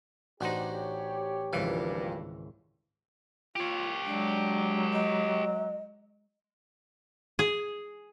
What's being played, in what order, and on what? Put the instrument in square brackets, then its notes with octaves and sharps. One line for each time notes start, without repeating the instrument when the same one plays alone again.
[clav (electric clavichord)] A1 D#4 [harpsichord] D4 F#4 C5 [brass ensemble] G4 C#5
[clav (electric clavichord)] G#1 C#2 E3 [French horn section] G2 A#2 [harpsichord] F3 F5
[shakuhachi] F4 [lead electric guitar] G4 C#5
[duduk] F#3 [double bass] G#3 [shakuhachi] D4
[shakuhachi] D#5
[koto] G#4